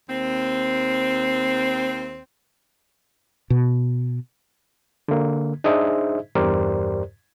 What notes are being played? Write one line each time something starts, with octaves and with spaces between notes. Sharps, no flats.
D#2 C4
B2
D3 A#3
D4 D#4 G#4 C5 D#5 E5
E2 G2 G4 A#4 C5 D5